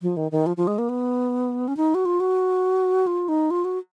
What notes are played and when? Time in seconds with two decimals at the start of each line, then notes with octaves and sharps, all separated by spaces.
0.02 F3
0.17 D#3
0.32 D#3
0.46 F3
0.57 F3
0.67 G#3
0.78 A#3
0.89 B3
1.68 C#4
1.77 D#4
1.95 F#4
2.06 F4
2.20 F#4
3.07 F4
3.29 D#4
3.51 F4
3.65 F#4